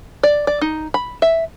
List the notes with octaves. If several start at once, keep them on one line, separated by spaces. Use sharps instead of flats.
D5
D5
D#4
B5
E5